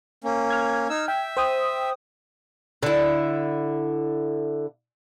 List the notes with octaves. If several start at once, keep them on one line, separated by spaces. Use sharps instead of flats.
A#3 C#4
F6 G#6
D#4 E6
E5 G5
C5 G5 D#6
D3 E4